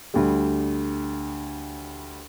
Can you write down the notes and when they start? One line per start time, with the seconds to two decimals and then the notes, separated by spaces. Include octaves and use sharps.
0.14 D2 G3